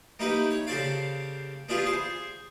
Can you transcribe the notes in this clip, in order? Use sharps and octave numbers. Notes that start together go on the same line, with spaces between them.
A#3 D#4 E4 G4 B4
C#5
C#3 G4 A4 C5 D5 F5
B3 D4 E4 F4 G4 G#4
G#4 C5